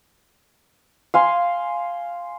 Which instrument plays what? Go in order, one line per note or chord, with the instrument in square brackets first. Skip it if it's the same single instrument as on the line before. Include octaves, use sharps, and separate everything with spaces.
[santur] F5 G#5 C6